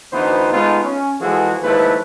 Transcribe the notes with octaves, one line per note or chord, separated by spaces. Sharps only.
D2 E3 B3 D#4 B4 C5
G#3 A3 B3 D#4 F4
C#4
E3 F3 G#3 F#4 G#4 A4
D#2 F3 G#3 A3 E4 B4